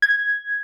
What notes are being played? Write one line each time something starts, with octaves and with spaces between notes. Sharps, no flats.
G#6